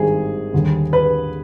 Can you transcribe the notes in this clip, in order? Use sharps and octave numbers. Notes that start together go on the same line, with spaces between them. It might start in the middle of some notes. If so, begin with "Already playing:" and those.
Already playing: G#1 G2 D#3 G3 G#4
D#2 D3 G3
B4